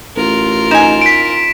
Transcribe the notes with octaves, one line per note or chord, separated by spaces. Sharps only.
A1 F4 A#4
D#4 G#5 E7
B6 D7